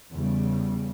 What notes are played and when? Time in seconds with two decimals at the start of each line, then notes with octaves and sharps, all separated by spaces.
0.11 E2 C#3 G3